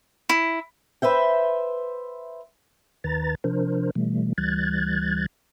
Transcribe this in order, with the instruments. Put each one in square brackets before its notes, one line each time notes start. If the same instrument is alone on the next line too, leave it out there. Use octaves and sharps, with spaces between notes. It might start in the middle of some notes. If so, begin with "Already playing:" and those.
[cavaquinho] E4
[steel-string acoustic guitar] B4 C5 E5 G5
[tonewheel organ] D#2 D#3 B4 A#5 A6
C3 F3 D4 A#4 C5
B2 E3 G3 A3
D2 E3 G3 F#6 G#6 A6